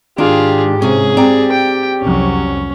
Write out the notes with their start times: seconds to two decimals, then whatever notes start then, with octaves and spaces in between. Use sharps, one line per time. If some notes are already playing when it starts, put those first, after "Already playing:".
0.18 G#2 D#3 D4 F4 G4 G#4
0.82 C3 C#4 G#4
1.17 C4 G4 D5 A#5
1.52 G5
2.02 C2 F2 F#3 C#4